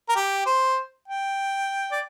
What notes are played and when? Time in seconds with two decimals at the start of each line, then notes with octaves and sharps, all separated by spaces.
0.09 A#4
0.16 G4
0.46 C5
1.08 G5
1.92 D5